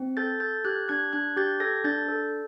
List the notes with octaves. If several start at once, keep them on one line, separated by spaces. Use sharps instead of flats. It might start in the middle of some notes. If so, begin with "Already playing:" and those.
Already playing: C4
A4 G6 A6
A4 G6 A6
G4 F#6 G#6
D4 F#6 G#6
D4 F#6 G#6
G4 G6 A6
A4 G#6 A#6
D4 G6 A6
A4